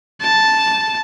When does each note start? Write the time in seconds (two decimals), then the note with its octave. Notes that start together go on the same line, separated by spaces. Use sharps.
0.21 A5